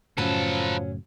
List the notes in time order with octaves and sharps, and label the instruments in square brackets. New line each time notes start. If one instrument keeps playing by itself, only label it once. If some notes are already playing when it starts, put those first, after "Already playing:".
[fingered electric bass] F#2 A2 C#3 [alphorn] F3 [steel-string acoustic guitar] F#3 C#4 [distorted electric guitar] A4 B4